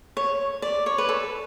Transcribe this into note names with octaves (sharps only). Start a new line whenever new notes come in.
C#5
D5
C#5
B4
A4